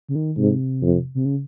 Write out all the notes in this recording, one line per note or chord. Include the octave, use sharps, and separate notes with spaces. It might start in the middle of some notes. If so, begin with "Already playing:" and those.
C#3
D#3
G#2 C3
F2
C3
C#3